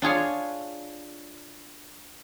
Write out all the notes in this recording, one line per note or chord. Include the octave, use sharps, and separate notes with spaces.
D4 F4 G#4 C#5